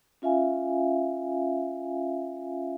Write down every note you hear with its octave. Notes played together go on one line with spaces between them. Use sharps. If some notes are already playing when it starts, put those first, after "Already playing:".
C#4 F4 E5 F5 G#5